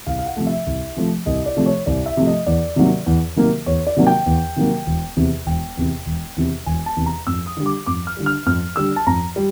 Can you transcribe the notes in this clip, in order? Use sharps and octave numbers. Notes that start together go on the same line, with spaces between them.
C2 F5
F5
F#5
C3 F3 A3
E5
C2
C3 F3 A3
C2 D#5
D5
C3 F3 A3
C#5
C2 D5
E5
C3 F3 A3
D#5
E2 D5
C3 D#3 F#3 A#3
E2
C3 D#3 F#3 A#3
E2 C#5
D5
C3 D#3 F#3 A#3
G5
E2
C3 D#3 F#3 A#3
E1
E2 C3
E1 G5
E2 C3
E1
E2 C3
E1 G#5
A5
E2 C3
A#5
F2 E6
D#6
D3 G3
D6
F2 D6
F6
D3 G3
F6
F2 F6
D3 G3 E6
A5
F2 A#5
G3